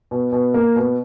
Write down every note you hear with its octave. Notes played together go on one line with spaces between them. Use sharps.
B2
B2
A#3
B2